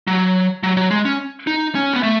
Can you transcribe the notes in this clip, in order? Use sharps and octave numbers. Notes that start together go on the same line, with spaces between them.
F#3
F#3
F#3
G#3
C#4
D#4
C#4
B3
A3